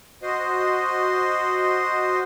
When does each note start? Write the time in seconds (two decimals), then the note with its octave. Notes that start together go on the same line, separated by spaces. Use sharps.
0.22 F#4 C5 D#5